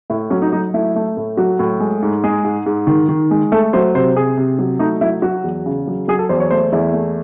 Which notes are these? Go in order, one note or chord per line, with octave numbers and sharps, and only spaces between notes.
A2 E4
F#3 C#4
D#4
F#3 D#4
A3 E4
A3
A2
F#3 F#4
A2
G#3
G#2
G#3 G#4
G#2
G#2
D#3
D#3
G#3
A3 A4
F#3 C5
C3 C5
C3 G#4
C3
F#3
A3 D#4
F#3 E4
F#3 F#4
E2
C#3
F#3
F#3 G#4
A4
E2 C5
C#5
A3 C5
E2 E4
A3